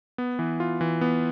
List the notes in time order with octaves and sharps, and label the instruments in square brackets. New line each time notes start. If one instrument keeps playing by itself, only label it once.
[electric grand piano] B3
E3
F4
E3
B3